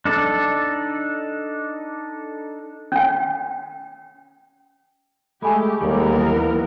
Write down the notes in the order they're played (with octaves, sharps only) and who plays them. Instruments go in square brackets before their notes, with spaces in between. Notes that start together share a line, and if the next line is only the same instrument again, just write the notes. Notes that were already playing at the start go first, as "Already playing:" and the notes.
[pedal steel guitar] D4 D#4 A4 D5
[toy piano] C#4 G5
[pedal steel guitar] G#3 [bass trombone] A3 [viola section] G4 [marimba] G#5 B5
[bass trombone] D#2 [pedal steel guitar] G3 G#3 [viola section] B3 A#4
[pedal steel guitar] E3 A#3 [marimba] F#3